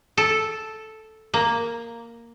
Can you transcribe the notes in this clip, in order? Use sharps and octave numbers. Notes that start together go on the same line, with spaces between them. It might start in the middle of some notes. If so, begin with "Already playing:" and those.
A4
A#3